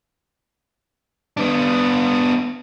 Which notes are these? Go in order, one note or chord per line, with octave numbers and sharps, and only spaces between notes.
B3 D4